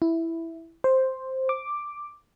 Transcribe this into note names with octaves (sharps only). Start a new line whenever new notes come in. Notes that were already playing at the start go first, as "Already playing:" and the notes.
E4
C5
D6